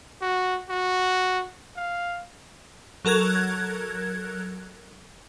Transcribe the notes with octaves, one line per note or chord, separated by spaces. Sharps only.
F#4
F#4
F5
F#3 A4 A#4 F#6 G#6